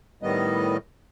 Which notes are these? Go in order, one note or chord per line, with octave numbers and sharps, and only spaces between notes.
A2 D#3 G3 B3 D#5